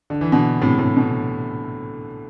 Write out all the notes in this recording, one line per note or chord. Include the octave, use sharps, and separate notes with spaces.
D3
E3
B2 D3
A2 C3
A2 C3
B2